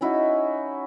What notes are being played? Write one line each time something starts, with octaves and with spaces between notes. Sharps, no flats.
C#4 D#4 E4 F#4